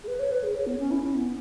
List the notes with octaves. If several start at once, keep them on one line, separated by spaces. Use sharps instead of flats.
G#4
B4
C#5
B4
G#4
C#5
B3
C#4
E4
C#4
B3